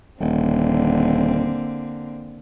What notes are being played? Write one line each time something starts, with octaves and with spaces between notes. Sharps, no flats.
D#1 D3 A#3 C4